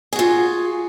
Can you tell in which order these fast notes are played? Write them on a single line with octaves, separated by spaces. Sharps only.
G#4 F#4 F4